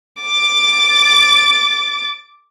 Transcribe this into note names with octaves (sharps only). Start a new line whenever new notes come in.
D6 A6